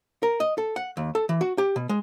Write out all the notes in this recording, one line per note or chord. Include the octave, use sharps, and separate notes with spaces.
A#4
D#5
A4
F#5
D#2
A4
E3
F#4
G4
B2
G#3